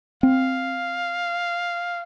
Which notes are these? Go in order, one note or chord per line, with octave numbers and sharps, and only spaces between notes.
C4 F5